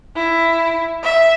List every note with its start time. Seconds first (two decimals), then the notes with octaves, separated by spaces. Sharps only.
0.16 E4
1.03 E5